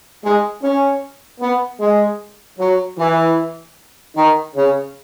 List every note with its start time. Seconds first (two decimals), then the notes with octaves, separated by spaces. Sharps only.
0.24 G#3
0.62 C#4
1.40 B3
1.80 G#3
2.59 F#3
2.98 E3
4.15 D#3
4.55 C#3